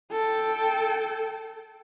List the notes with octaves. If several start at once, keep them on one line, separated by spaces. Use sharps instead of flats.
A4 G5